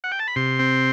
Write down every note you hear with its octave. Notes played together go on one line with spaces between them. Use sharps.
F#5
G5
A5
B5
C3 C6
C4